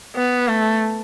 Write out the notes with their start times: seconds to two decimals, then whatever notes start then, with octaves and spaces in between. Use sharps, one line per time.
0.16 B3
0.48 A3